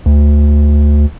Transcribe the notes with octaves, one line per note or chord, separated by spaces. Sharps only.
D2